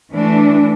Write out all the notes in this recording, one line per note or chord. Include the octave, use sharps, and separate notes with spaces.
E3 A3 D4